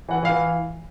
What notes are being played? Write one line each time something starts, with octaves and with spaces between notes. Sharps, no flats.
E3 F#5
E3 F5